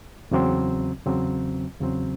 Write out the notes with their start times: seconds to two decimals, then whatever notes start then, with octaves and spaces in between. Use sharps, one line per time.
0.31 E2 C#3 F#3 C4
1.06 E2 C#3 F#3 C4
1.80 E2 C#3 F#3 C4